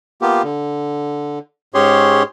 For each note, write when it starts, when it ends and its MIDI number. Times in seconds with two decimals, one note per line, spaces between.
0.22 0.42 58
0.22 0.42 59
0.22 0.42 65
0.22 0.42 67
0.43 1.39 50
1.74 2.23 44
1.74 2.23 61
1.74 2.23 67
1.74 2.23 68
1.74 2.23 73
1.74 2.23 84